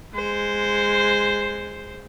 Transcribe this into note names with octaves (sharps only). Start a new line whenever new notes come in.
G#3 C5